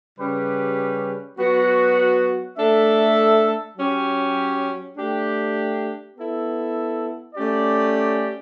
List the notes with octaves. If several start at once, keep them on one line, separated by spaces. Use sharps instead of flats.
C#3 G3 C#4 G4 B4
F#3 B3 F#4
A3 D4 A4 E5
F#3 C#4 G4
A3 D4 G4
B3 E4 A4
A3 C#4 G4 D5